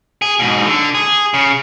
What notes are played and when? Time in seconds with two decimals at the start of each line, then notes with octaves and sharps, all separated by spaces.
0.22 G#4
0.39 G#2 B2
0.65 D3
0.95 G#4
1.34 C#3